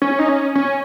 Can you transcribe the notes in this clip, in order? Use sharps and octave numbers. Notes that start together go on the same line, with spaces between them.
C#4
D#4
C#4
C#4